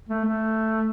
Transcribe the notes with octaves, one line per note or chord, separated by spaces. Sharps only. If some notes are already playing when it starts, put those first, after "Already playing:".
A3
A3